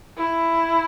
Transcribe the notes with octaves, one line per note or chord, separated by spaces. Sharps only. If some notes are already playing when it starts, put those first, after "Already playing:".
E4